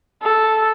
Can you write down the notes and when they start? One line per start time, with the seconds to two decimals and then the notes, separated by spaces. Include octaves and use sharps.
0.22 A4